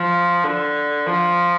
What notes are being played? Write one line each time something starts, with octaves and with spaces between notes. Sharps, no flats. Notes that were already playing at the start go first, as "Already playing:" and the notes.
Already playing: F3
D3
F3